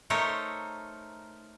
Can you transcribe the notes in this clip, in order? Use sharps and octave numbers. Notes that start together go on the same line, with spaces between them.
A3 D#4 A#4 C5 C#5 E5